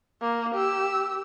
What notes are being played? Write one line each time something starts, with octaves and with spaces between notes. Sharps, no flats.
A#3
G4 E6